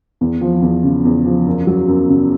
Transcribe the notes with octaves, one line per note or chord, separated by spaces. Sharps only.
E2
F3
E2
C#3
E2
F3
F#2
F#3
F#2
C#3